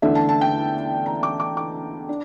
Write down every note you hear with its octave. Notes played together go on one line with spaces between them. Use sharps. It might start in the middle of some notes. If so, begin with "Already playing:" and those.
E2 D3 A3 D4 E5
A5
A5
G5
A#5
D6
D6
D6
D4